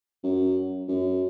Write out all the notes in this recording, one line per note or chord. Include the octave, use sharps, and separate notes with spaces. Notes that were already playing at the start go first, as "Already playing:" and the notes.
F#2
F#2